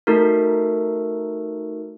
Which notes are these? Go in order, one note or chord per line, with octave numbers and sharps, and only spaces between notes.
A3 D#4 F#4 A4 A#4